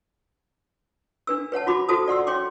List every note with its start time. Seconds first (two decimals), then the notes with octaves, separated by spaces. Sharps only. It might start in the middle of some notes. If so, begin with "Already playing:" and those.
1.27 D4 B4 E6
1.52 B4 C#5 F#5 A5
1.67 F4 F#4 B5 D6
1.89 F4 F#4 A4 C5 A5 D#6
2.08 D5 F#5 C6 E6
2.27 C#5 G5 C6 D6